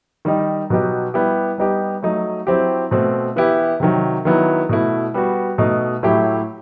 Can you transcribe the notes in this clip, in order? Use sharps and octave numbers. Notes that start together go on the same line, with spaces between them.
D#3 G3 D#4
B2 F#3 B3 D#4 G4
G3 B3 E4 G4
G3 B3 D#4 G4
F#3 A3 D#4
F#3 C4 E4 G4
B2 A3 C4
E3 B3 E4 G4
C3 D#3 F#3
D#3 F#3 B3 E4
B2 A3 E4
G3 B3 F#4
B2 A3 D#4
A2 F#3 A3 E4 G4